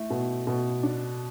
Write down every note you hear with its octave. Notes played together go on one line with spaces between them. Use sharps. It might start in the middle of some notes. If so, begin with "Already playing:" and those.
Already playing: A3 E4
B2
B2
D4